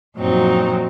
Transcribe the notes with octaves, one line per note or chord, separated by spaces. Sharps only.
F#2 A#2 F3 F#3 C4 D#4